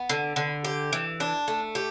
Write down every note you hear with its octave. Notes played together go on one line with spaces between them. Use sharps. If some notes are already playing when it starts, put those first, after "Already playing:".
Already playing: B3
D3
D3
G4
E3
D4
A3
G4